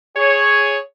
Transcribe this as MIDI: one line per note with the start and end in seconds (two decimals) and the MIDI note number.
0.16 0.78 68
0.16 0.78 73